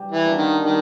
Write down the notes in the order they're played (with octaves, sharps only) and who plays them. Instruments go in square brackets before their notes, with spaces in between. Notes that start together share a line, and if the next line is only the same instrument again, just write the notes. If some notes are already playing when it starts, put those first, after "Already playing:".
Already playing: [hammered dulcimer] G3
[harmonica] E3
[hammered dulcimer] A#3 D4 F#4
[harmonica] D#3
[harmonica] D#3 [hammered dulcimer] G3